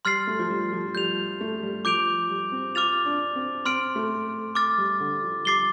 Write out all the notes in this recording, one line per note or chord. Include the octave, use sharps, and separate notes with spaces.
G3 C6 F6 A6 C7
A3
F3
G3
F3
G3 G6 F7
A3
G3
F3 D6 G6 D7 F7
G3
C4
F4 D6 F6 A6 F7
D4
C4
C4 C6 F6 D7
A3
D6 F6 A6
G3
D3
F3
G3 D6 A6 C7 G7